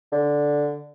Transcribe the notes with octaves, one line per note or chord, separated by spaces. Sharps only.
D3